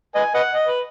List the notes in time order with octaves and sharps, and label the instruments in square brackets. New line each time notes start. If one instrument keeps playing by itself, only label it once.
[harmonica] B4 D#5 G#5
B4 D#5 F#5
D#5
B4